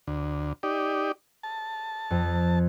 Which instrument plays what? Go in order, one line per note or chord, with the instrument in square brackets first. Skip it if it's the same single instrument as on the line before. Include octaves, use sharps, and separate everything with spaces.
[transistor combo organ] D2
D#4 G4 D5
A5
[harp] F2